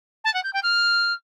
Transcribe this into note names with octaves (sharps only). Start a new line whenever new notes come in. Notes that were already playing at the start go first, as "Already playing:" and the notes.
A5
F#5
G6
G5
F6